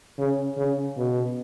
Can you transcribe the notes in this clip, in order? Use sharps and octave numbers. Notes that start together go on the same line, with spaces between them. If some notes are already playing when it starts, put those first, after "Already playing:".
C#3
C#3
B2